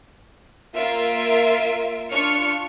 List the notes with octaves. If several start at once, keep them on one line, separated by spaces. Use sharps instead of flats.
A#3 F4 A#4 E5 D7
D4 F4 C#6 F6 C#7